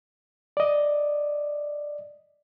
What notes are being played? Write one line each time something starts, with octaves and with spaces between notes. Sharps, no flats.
D5 D#5